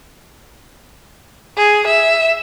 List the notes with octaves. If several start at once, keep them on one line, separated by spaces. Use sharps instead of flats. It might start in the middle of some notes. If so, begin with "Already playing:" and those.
G#4
E5